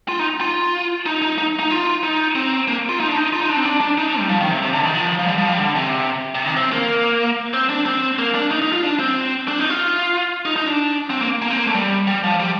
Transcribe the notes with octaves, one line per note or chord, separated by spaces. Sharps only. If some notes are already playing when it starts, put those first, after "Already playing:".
F4
D#4
F4
D#4
D#4
D#4
D#4
F4
D#4
C4
A#3
F4
D#4
D4
D#4
F4
D#4
D4
C4
D4
D4
D#4
D4
G3
F3
D#3
C3
C3
D3
D#3
F3
F3
G3
F3
G3
D3
C3
C3
D#3
C4
A#3
C4
D4
C4
A#3
D4
D#4
D#4
F4
D4
C4
D4
D#4
F4
D#4
D#4
D4
C4
A#3
A#3
C4
A#3
A3
G3
G3
F3
G3